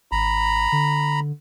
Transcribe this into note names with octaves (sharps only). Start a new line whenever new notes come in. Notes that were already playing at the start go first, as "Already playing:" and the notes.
G#1 A#5 B5
D3